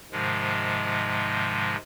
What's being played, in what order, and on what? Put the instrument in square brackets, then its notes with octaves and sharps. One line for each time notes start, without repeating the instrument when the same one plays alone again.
[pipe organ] G#2 C3 D#3 F3 G#3